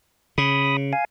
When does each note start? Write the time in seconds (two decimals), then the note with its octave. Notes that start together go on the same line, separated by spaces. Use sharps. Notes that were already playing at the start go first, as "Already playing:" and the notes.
0.38 C#3 B5 D#6
0.93 F5 G#5